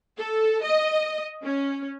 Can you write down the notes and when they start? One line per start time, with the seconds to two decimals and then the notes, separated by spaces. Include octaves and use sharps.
0.18 A4
0.64 D#5
1.43 C#4